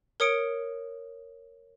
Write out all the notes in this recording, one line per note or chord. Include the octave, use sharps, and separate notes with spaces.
A#4 C#5 D#6 C#7 D7